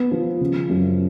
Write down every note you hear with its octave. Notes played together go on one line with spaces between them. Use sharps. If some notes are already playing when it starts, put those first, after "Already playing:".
Already playing: B3
F3
C#3
F#2